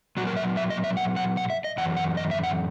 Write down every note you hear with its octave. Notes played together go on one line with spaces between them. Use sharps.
A#2 F#3 F#4
A#4
E5
E5
D#5
E5
F#5
F#5
F#5
E5
D#5
F#2 E3 F#5
F#5
D#5
E5
F#5